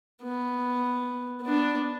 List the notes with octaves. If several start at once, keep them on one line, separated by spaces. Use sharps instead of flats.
B3
B3 D4